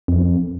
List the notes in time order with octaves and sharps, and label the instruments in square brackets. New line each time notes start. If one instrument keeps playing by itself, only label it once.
[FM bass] F2